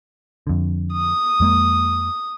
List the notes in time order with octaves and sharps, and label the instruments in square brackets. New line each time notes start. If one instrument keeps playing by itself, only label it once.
[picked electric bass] F2 D3
[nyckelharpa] D#6
[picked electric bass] F2 G#3 A#3